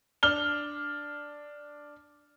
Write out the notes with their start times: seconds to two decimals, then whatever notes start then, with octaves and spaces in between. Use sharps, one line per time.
0.23 D4 F6 G7